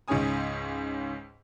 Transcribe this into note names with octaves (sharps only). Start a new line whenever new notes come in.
C#2 G#2 G#3 C#4 G#5 D#6